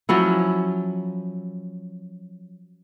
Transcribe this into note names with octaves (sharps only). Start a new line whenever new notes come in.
F3 F#3 C#4 E4